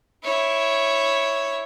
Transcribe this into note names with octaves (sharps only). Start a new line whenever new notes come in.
E4 C#5